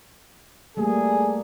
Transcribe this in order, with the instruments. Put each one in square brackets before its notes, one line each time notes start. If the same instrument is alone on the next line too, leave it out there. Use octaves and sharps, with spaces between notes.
[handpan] G3 A3 A#3 [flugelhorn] G#4